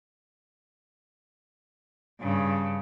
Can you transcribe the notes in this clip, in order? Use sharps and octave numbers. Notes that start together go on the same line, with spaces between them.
G2 C#3